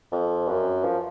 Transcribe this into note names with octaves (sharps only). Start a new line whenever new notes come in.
F2
F#2
F3